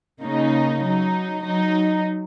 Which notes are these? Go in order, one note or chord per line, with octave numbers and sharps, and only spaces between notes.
C#3 A#3 D#4
F#3 D#4
F#3 D#4